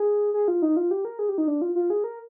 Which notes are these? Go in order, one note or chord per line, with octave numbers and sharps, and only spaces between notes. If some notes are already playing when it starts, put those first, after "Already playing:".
Already playing: G#4
G#4
F4
D#4
F4
G4
A#4
G#4
G4
D#4
D4
F4
F4
G#4
A#4